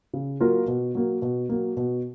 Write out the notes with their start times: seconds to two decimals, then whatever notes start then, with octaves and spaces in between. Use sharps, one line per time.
0.13 C#3
0.40 F#3 A#3 F4 A#4
0.68 B2
0.95 F#3 A#3
1.22 B2
1.49 F#3 A#3
1.77 B2